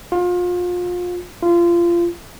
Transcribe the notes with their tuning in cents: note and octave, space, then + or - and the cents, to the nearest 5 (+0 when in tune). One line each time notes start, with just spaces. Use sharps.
F4 +30
F4 -25